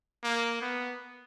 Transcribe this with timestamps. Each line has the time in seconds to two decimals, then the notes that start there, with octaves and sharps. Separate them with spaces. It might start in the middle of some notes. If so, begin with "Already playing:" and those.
0.24 A#3
0.61 B3